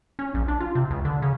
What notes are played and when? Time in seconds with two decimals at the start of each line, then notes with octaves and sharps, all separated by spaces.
0.19 C#4
0.34 A#1
0.48 D4
0.60 F4
0.75 C3
0.90 C#2
1.05 D3
1.22 C#3